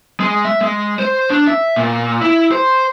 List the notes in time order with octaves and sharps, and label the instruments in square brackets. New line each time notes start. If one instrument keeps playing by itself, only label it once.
[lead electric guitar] G#3
E5
G#3
C5
D4
E5
A#2
E4
C5